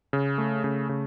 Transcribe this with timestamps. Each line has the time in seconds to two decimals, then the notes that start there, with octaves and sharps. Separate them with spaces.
0.13 C#3
0.38 A3
0.64 C#3
0.89 C#3